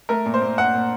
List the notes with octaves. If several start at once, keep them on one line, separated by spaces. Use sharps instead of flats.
A3 A#4
A#2
C5
A#2
A#2 F#5
A#2